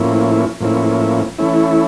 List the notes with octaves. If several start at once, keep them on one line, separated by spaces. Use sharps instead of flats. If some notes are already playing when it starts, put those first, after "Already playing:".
Already playing: A2 F3 A#3 C#4 E4
A2 F3 A#3 C#4 E4
E3 A3 C#4 E4